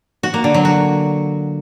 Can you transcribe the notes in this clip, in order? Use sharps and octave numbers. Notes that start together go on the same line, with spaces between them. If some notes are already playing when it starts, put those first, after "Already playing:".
F#4
A#3
D3
F#3
F#4